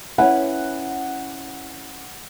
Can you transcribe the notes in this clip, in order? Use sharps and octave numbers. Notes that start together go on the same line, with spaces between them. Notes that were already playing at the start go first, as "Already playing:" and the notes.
C#4 E4 B4 F#5